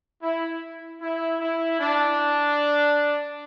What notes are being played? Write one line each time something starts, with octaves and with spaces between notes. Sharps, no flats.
E4
E4
E4
D4